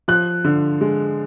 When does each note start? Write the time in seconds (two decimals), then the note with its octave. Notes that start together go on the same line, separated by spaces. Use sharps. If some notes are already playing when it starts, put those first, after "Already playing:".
0.08 F3 F#6
0.44 D3
0.81 G#3